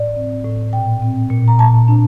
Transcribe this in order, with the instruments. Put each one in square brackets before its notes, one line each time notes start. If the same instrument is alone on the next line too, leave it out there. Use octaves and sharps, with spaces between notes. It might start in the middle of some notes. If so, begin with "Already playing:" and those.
Already playing: [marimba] A2 D5
C4
A2
A#2 G5
C4
A#2
A#5
A#2 A5
D4